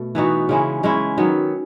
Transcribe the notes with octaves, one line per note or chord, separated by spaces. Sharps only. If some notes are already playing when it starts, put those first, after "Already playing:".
Already playing: B2 A3
E3 B3 D#4 F#4
C#3 G#3 C#4 E4
C#3 G#3 C#4 E4
D#3 F#3 B3